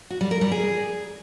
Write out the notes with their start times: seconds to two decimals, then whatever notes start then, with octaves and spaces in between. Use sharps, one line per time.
0.10 F#4
0.21 G3
0.31 A#4
0.41 G3
0.51 G#4